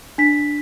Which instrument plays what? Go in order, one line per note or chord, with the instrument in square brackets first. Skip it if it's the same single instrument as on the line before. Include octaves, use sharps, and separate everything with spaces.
[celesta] D4 B6